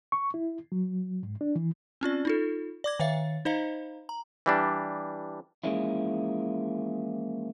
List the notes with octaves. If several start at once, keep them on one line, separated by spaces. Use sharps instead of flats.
C#6
E4
F#3
G#2
D4
E3
C4 C#4 F4 D5
D#4 F4 A4
D5 D6 G#6
D#3 C#5 E5 F5 A6
D#4 C5 D#5 F5 A#5
A#5
E3 G3 D4
E3 F3 G#3 A#3 C#4 E4